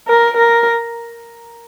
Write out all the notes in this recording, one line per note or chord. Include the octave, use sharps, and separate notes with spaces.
A#4
A#4